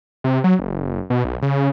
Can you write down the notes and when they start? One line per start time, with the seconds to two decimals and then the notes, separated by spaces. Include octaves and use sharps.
0.24 C3
0.44 F#3
0.59 F#1
1.10 B2
1.24 B1
1.42 C#3